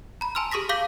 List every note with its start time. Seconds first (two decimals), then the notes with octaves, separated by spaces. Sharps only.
0.21 A#5 B5
0.35 G#5 A5 C6 E6 F6
0.52 G4 G#4 C#6 D#6 A#6 B6
0.69 F5 C#6 D6 G6 A#6 B6